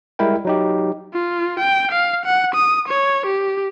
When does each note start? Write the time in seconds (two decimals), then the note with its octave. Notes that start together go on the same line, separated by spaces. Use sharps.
0.19 G3 G#3 E4 A#4 G5
0.45 F#3 D#4 G4
1.13 F4
1.59 G5
1.91 F5
2.26 F#5
2.54 D#6
2.88 C#5
3.26 G4